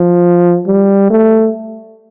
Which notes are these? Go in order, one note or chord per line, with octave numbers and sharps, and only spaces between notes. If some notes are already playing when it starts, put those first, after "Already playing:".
Already playing: F3
G3
A3